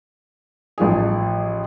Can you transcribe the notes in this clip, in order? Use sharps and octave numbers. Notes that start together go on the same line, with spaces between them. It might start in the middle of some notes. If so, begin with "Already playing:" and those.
A1 F3 G#4